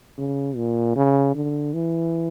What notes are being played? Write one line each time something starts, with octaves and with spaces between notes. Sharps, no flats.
C#3
A#2
C#3
D3
E3